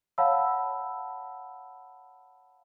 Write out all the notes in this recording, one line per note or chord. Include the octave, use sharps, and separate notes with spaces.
C#5 F5 F#5 A5 B5 E6